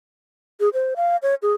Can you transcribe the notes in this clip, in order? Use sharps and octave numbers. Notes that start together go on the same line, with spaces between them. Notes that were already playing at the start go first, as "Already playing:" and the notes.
G#4
C5
F5
C#5
G#4